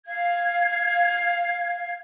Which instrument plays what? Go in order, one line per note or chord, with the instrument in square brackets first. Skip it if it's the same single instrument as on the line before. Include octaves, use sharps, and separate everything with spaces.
[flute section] F5 G#6